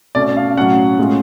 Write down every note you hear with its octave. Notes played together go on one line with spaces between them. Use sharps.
B2 A3 C#4 D5
F5
A2 F#3 C#4 F#5
A2 G#3 C#4 F4